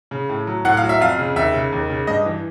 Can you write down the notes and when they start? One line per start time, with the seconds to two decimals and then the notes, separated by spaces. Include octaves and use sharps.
0.11 C#3
0.29 A2
0.47 F#3
0.65 A2 F#5
0.77 F5
0.83 F#3
0.89 E5
1.01 F2 F5
1.18 C#3
1.36 D#2 E5
1.54 C#3
1.72 D#2
1.90 C#3
2.07 G2 D#5
2.26 E3